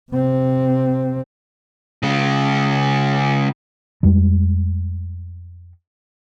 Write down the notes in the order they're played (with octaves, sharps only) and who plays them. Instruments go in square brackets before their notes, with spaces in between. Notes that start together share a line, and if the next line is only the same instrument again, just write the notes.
[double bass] C3 C4
[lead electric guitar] C#3 G#3
[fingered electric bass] F2 G3 G#3